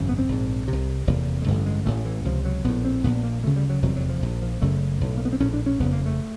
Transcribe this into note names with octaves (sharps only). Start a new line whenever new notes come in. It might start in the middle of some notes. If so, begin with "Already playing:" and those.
Already playing: G#1 F#2 C#3
B3
C4
A#1 G#2
C2 C3
F1 E2 C3 A#3
G#3
A1 G2 D3 A3
G#3
A1 A2 A3
E3
C#2 C3 F3
F#3
A#1 A2 B3
C4
A#1 A#2 B3
A#3
D2 C#3 A3
G3
F#3
F1 E2 C3 F#3
F#3
F3
A#1 A#2
F3
F#1 F#2 C#3 A3
B1 A2
A#3
B3
C4
A#1 A2 C#4
D4
C#4
F#1 F2 C#3 B3
A#3
A3